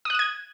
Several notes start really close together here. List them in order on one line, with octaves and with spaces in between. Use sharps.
D#6 F#6 D#7 G#6